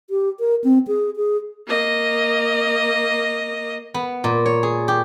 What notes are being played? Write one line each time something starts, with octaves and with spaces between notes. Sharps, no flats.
G4
A#4
C4
G#4
G#4
A#3 D#5
B3
A#2
C#5
G#4
G4